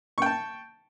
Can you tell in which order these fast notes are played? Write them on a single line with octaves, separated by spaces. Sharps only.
C#6 G5 A5